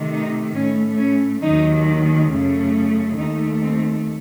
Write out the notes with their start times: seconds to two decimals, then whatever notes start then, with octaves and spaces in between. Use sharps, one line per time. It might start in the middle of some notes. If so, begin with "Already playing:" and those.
Already playing: C3 D#3 A3
0.10 D#4
0.55 A2 A3 C#4
0.98 C#4
1.42 D#2 D#3 F#3 D#4
2.30 F#2 C#3 A3
3.17 D#2 D#3 A3 D#4
3.61 C4